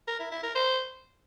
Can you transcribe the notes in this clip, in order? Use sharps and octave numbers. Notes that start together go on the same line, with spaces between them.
A#4
E4
E4
A#4
C5